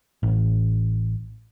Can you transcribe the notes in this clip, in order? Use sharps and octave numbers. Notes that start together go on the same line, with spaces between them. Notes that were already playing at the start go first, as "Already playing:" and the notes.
A1